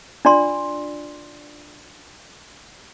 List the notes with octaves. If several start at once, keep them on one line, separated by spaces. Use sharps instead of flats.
D4 F4 D5 A#5 C6